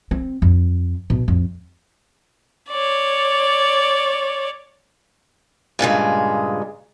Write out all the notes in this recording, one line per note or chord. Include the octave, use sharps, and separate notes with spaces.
C4
F2
B2
F2
C#5 D5
G2 A#2 C#3 G#3